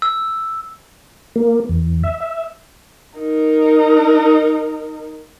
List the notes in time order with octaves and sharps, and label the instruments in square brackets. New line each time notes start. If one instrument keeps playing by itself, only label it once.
[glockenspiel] E6
[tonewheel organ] A#3
E2
E5
E5
[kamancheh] D#4 A#4